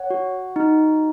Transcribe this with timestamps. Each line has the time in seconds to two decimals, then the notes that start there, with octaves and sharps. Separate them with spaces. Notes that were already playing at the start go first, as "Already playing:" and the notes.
Already playing: C#5 F#5
0.10 F#4
0.56 D#4